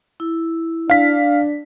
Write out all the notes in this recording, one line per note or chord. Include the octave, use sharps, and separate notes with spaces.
E4
D4 F5 B6